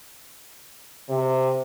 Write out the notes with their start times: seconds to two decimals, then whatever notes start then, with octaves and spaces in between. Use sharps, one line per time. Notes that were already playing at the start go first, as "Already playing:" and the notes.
1.09 C3